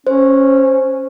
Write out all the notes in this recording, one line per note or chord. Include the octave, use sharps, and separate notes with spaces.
C#4 C5